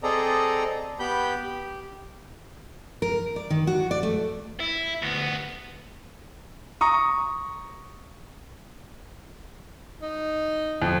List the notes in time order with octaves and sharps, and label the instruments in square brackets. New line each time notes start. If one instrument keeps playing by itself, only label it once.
[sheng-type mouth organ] C4 G#4 A4 D5 D#5 A#5
B3 G4 B5 G6
G4
[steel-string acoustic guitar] A#4
D5
D#3
F#4
D5
A3
[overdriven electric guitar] E4
D2 B3
[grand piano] A#5 C#6 D#6
[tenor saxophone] D#4
[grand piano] F2